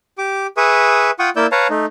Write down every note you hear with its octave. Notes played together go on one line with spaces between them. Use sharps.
G4 D6
G#4 B4 E5 C#6 D#6
F4 F#5 G5 C#6 D#6
A#3 E4 D5 E6 G6
B4 C#5 F5 A5 A#5
A3 D#4